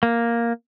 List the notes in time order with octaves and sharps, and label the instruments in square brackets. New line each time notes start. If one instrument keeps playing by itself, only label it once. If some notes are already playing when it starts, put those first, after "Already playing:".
[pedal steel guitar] A#3